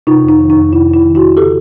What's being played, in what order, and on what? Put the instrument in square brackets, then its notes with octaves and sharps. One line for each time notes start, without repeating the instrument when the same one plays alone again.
[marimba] C3 D#4 F4
F2
D#4
D#3
D#4
F2
C3 E4
F2 E4
D#3
E4 F#4
F2
C#3 G4 A4